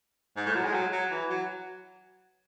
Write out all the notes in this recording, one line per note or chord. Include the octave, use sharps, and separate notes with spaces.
G#2
A2
F#3
G#3
F#3
F#3
E3
F#3